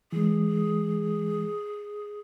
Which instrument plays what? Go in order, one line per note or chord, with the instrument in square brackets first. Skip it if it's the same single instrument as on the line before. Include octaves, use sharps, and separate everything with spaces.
[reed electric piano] E3 G#3 [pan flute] G#4